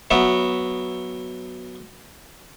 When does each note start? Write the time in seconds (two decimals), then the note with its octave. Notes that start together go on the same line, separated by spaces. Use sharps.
0.11 F#3 B3 E5